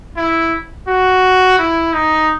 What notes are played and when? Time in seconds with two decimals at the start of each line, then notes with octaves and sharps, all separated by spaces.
0.16 E4
0.87 F#4
1.59 E4
1.93 D#4